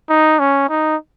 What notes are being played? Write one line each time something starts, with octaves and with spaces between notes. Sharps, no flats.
D#4
C#4
D#4